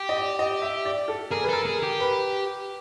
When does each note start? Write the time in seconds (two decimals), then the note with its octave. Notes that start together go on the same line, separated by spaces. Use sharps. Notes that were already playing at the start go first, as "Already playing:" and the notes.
Already playing: G4
0.09 D#5
0.17 D5
0.39 D#5
0.62 E5
0.85 D5
1.08 A4
1.31 G#4 A#4
1.43 B4
1.49 A4 A#4
1.65 G#4
1.83 G4
2.00 B4